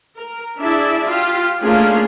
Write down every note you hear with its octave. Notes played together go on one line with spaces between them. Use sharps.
A#4
D4 E4 G#4 D5 E5
F4 G4
A3 A#3 C#4 D4 F4 G#4